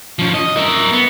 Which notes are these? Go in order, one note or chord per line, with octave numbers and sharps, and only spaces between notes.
F3 C#4
D#5
A#4 E5
B3